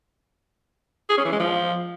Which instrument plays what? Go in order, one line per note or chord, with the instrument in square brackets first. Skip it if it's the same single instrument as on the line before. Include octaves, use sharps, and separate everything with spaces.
[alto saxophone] G#4
C#4
E3
G#3
F3